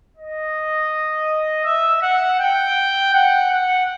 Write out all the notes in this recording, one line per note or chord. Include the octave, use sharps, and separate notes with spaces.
D#5
E5
F#5
G5
F#5
F#5